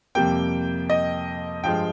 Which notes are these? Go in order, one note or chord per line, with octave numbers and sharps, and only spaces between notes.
F2 C3 G3 A#3 G5
D#5
G2 F3 G#3 G5